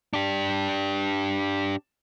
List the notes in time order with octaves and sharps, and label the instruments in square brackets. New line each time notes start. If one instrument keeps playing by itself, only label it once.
[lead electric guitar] D4 G4